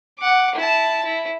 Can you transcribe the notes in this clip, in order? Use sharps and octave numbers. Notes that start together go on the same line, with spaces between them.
F#5 D6
E4 A5
E4